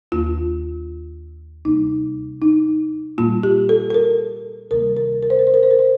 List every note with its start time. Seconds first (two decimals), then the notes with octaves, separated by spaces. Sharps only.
0.12 D#2 D#3 A#3 F4
1.65 D2 C3 G3 A#3 D#4
2.42 D#4
3.18 A#2 G3 A#3 F4
3.43 G4
3.69 A4
3.90 A4
3.94 A#4
4.71 D2 C3 D#3 G3 A#3 A#4
4.97 A#4
5.23 A#4
5.30 C5
5.39 A#4
5.47 C5
5.54 A#4
5.63 C5
5.71 A#4
5.79 C5